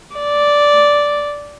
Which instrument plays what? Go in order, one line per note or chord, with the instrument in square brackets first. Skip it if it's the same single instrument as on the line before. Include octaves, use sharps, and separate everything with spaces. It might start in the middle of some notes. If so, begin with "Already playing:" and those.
[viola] D5